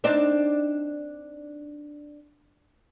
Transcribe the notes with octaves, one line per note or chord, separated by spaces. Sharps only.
C4 D4 D#4